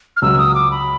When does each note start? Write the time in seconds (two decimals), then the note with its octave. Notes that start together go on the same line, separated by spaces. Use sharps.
0.17 F6
0.22 C#2 C#3 F#3 E6
0.38 D#6
0.55 D6
0.71 B5